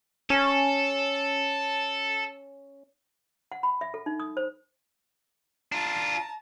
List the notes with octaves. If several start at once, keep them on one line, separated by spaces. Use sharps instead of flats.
C#4 A4
F#5
B5
E5
A4
D#4
D#6
C5
D4 F4 A5 A#5